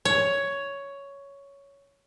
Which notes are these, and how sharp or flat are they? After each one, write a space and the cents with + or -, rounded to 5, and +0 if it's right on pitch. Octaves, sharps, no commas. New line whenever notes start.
C#5 +10